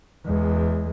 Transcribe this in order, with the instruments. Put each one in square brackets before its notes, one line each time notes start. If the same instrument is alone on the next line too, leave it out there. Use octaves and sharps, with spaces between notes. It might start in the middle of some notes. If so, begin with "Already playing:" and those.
[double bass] E2 G#3